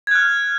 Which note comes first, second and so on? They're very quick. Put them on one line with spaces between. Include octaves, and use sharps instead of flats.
G#6 F#6 F6